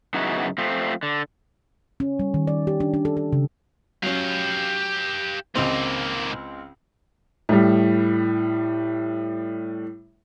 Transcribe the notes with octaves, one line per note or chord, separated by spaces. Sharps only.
F#2 C#3 B3 D#4 E4 F#4
F3 A3 C4
D3
C#4
G3
D#3
D5
G4
D4
D4
A4
A4
C#3
F#3 C#4 G4 F5
C#2 G#2 G#3 A#3 C4
A2 G3